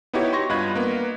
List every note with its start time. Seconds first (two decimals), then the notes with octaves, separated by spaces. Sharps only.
0.14 B3 D#4 E4 F#4 G4 C#5
0.33 C6 C#6 A#6
0.50 G2 F4 D#5 B5 F#6 G#6
0.75 A#3 B3